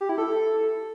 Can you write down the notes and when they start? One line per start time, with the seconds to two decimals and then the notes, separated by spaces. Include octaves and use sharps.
0.01 G4
0.09 E4
0.18 A4